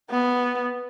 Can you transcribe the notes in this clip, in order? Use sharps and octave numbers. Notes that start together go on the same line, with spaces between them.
B3